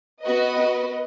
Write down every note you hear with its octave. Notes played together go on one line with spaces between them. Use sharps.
B3 F#4 B4 D#5
B3 F#4